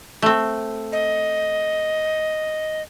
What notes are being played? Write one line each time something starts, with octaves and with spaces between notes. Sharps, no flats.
A3 C4
D#5